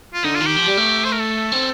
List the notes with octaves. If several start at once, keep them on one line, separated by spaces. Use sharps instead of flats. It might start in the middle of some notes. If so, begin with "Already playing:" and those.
F4
D3 D#4
F4
D#3
G4
F3
G3
A3
C5
A#4
A4
C4